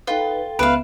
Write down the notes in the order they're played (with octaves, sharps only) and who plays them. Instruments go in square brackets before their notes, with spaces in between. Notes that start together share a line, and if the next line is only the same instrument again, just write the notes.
[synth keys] D#4 B4 [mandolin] F4 [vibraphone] A4 G5
[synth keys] C#2 [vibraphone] B3 E5 [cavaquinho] B4 F5